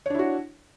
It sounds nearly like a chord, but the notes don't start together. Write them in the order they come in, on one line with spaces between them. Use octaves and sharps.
C#5 D4 E4 F#4